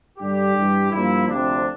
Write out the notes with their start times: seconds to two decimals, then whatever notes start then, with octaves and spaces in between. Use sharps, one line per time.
0.19 G2 D3 G3 G4
0.55 G2 E3 G3
0.91 G2 F3 A#3 E4
1.29 D2 C3 F3 C4 D4